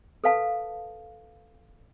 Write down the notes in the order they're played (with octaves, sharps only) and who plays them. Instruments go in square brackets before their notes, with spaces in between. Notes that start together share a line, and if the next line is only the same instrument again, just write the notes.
[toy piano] A4 B4 F5 A5